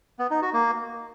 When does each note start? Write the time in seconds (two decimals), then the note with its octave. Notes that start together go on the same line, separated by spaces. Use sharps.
0.19 B3
0.30 D#4
0.42 F#4
0.53 A#3